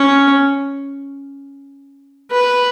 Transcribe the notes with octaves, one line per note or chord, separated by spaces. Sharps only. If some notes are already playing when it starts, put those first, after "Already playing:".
Already playing: C#4
B4